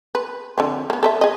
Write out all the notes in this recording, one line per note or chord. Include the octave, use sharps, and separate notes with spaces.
B4
D3 F3 C4
A#3 B3
A4 B4 E5
G#4 D#5